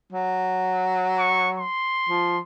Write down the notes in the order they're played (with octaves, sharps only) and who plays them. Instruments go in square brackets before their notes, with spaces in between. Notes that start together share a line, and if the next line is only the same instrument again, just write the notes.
[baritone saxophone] F#3
[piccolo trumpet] C#6
C6
[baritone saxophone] F3